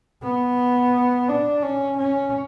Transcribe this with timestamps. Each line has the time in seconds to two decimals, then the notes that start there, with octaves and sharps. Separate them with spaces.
0.22 B3
1.28 D4
1.62 C#4
1.97 C#4